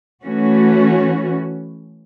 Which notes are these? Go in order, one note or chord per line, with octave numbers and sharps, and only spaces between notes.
E3 A3 C#4 F#4